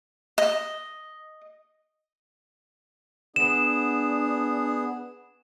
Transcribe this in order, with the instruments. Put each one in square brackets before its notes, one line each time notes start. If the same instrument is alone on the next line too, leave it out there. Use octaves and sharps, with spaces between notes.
[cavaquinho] D#5
[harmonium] B3 G#4 [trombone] D4 [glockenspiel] E7